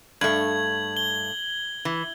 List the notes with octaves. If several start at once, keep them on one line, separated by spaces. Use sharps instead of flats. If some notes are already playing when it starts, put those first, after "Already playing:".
G2 A3 G#6 F#7
G7
E3